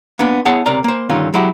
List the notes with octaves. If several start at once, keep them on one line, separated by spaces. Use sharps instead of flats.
A#3 B3 D4
B3 E4 G#4 C#5 F#5 A5
C#2 C3 A#4 D5 A#5
A#3 C5
G2 D3 D#3 C#4 F4
F#3 G#3 E4 F#4 G4